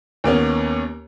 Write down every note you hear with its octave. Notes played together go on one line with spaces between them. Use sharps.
D#2 A#3 B3 C#4